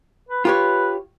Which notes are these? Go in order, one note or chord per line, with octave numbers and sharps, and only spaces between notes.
B4
F4 G4 B4 C#5